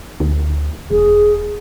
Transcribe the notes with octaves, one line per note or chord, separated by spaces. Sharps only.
D2
E1 G#4